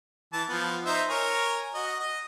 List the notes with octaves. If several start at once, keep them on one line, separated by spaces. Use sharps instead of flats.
E3 A5
F3 B3
D#4 C5 E5
A#4 C#5 G#5
F#4 D#5
D#5